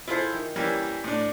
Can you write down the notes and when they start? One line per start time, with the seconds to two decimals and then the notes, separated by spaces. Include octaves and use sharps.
0.08 E4 F4 G#4 A4 C5 F5
0.33 D#3
0.56 E3 G3 A#3 C#4
1.04 A2 D4